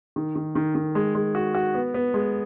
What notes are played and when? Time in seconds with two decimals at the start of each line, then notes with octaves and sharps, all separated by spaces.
0.16 D#3
0.36 D#3
0.55 D#3
0.75 D#3
0.95 G#3
1.15 G#3
1.35 F#4
1.54 F#4
1.74 B3
1.94 B3
2.14 G#3